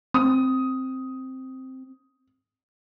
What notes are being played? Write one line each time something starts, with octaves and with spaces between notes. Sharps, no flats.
C4 D#6